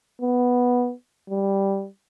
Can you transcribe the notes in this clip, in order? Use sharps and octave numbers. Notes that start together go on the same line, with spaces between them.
B3
G3